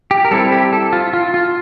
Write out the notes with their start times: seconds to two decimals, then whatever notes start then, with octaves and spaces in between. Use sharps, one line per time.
0.11 G4
0.25 A#4
0.31 G3 C4 E4 A4
0.52 G4
0.73 A4
0.93 F4
1.13 F4
1.34 F4